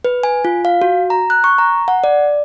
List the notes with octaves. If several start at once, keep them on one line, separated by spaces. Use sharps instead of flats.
B4
G#5
F4
F5
F#4
A#5
F#6
C#6
A#5
F#5
D5